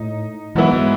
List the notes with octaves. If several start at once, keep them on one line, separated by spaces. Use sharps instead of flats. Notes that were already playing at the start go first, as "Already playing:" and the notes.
Already playing: A2 D#4
G#2 E3 F#3 B3 E4
G#3